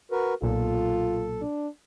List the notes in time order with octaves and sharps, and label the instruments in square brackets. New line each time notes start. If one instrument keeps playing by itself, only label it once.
[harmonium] F#4 A#4 B4
[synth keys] B1 A#2 [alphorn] F4 [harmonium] A4
[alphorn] D4